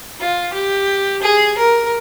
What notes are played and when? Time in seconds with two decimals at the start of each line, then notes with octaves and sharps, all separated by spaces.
0.19 F4
0.53 G4
1.22 G#4
1.57 A#4